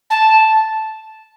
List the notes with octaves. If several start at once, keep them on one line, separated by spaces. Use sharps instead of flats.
A5